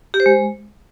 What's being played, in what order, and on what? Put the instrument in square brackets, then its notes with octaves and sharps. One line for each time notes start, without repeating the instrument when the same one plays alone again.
[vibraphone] G4
C5
G#3